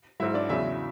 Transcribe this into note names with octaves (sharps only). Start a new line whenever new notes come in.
G#2 F#3 E4 E5
D4 D5
E2 C#3 F#3 E4 E5